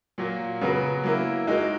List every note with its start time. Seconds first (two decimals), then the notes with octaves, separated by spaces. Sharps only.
0.18 A#2 F#3 A#3
0.61 C#3 F#3 B3 F#4 A#4
1.04 F#3 A#3 E4 A#4
1.47 G#3 D#4 F#4 A#4